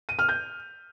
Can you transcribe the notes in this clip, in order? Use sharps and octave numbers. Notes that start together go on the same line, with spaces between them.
D#7
F6
G6